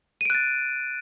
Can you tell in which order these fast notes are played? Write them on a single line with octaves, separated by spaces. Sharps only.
D#7 D7 F#6 A6